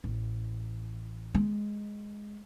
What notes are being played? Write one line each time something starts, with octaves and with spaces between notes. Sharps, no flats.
A1
G#3